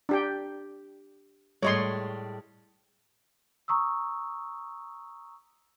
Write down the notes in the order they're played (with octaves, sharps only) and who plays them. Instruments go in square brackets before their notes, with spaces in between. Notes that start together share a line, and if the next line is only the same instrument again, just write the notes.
[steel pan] D4 G4 G5
[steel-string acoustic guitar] A2 G3 G#3 [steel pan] C#5 D#5 C6
[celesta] A#5 C#6 D#6 E6